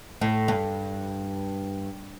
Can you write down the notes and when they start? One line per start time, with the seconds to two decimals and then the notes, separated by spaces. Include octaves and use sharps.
0.21 A2
0.48 G2